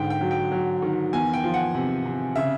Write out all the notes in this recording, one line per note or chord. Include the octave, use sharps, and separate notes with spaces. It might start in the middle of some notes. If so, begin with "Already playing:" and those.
Already playing: G#2 D3 G5
G5
F#3
G5
F#3
D#3
E2 G#5
G5
F3
F#5
C3
C3
C#3 E5